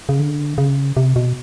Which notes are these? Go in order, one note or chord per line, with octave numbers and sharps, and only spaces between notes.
C#3
D3
C#3
C3
B2